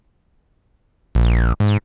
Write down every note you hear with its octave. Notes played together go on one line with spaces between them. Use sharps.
A#1
G#2